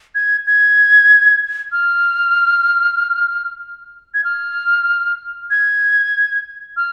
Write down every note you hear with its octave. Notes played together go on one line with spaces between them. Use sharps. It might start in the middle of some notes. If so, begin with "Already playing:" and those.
G#6
G#6
F6
G#6
F6
G#6
F6